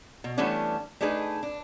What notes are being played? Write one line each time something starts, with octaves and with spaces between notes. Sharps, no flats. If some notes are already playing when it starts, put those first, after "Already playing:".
B2
E3 G3 A3 B3 C#4 D4
A3 D4 D#4 G#4 B4
D4